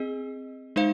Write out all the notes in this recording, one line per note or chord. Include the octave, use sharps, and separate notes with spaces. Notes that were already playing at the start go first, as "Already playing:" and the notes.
Already playing: C4 G#4 D#5
G#3 D#4 C5 F5